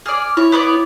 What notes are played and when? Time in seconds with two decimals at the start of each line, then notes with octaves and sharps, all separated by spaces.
0.06 G#4 D5 F6
0.37 E4 C#5
0.52 B3 C#5 D5